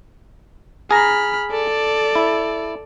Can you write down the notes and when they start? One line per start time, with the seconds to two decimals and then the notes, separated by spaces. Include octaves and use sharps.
0.91 G#4 A#5 B5 F6
1.51 A4 D5
2.15 E4